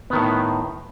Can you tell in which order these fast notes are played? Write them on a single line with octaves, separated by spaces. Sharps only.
B3 D#3 A2